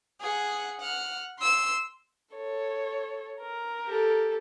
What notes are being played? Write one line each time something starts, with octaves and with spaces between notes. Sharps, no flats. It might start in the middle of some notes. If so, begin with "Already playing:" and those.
G#4 F#5
F#5 F6
C6 E6
A4 C#5
A#4
G4 A4